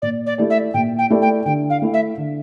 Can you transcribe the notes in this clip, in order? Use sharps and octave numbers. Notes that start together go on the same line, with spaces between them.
A#2 D5
D5
A3 E4 G4 D5
E5
A#2 G5
G5
A3 E4 G4 D5
G5
D3 G5
F5
A3 E4
E5
D3